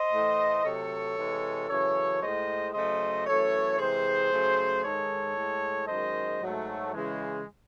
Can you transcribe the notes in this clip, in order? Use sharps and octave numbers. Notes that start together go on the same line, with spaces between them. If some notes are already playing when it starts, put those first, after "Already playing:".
Already playing: C5 D#5
A2 E3 A3
C3 F#3 A3 A4 C#5
C3 E3 G#3
F#2 C#3 E3 A4 C#5
A2 G#3 C5 D#5
C#3 F#3 A3 C5 D#5
F#2 E3 A3 A4 C#5
C3 E3 G#3 G#4 C5
C#3 F#3 A3
G#2 D#3 G#3 A4 C#5
A2 G#3
F#2 D#3 G#3 C5 D#5
G#2 F#3 A3
C#3 E3 G#3